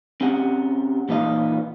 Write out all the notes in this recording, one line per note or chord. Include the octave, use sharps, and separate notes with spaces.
C4 C#4 G4 F#5
A#2 E3 B3 D#4 D#5 F5